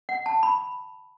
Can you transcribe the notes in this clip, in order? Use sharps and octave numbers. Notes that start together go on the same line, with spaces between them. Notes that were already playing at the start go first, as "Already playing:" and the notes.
F#5
A5
B5